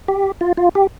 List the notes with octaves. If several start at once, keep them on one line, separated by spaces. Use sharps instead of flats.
G4
F4
F4
G4